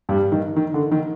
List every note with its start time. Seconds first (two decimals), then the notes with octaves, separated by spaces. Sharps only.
0.09 G2 G3
0.32 D#3
0.56 D#3
0.74 D3
0.92 D#3